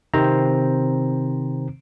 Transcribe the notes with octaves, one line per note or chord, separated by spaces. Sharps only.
C3 D#3 C4 C5 A#5